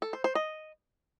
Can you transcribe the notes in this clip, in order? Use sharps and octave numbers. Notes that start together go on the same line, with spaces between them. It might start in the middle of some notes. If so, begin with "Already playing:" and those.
A4
C5
C5
D#5